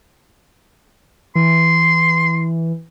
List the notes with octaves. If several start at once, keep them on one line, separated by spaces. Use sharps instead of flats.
E3 C6